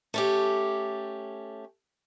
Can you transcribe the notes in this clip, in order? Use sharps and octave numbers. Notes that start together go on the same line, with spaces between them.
A3 C#4 G4